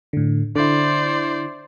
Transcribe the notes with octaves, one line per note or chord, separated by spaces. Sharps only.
A2 D3
D3 E4 C5 D5